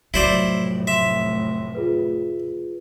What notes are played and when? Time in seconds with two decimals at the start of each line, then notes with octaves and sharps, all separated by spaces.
0.14 F1 A2 F#3 E4 C5 D5
0.87 E5 C6
1.75 F4 G#4 B4